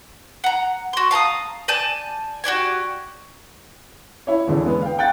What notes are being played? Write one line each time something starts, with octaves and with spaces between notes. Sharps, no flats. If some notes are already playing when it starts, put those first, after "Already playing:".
F#5 A#5
F#4 C6
F5 A5 A#5 D#6
D5 G#5 A5 G6
F#4 G4 D5 G#5
E4 C#5
E2 D3 E3
G#3 B3
F5 G5
F#5 G5 F#6 A6